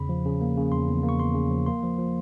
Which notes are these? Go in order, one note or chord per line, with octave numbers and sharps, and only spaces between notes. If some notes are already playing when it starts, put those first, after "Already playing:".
Already playing: E2 C#3 B5
F3
C#3
A#3
C#3
E2 C6
E2
A#3
C#6
E2 C6
C#3
F3
A#3 C6
F3
F3